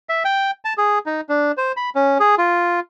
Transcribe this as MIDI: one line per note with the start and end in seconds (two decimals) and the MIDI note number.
0.09 0.23 76
0.25 0.51 79
0.65 0.74 81
0.78 0.99 68
1.06 1.21 63
1.29 1.52 62
1.58 1.72 72
1.77 1.90 83
1.95 2.18 61
2.20 2.35 68
2.38 2.80 65